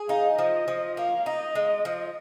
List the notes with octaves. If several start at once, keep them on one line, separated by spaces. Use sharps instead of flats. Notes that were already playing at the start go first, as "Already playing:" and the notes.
Already playing: G#4
D#4 F5
F3 D#5
F3
A#3 F5
D#4 D#5
G#3
F3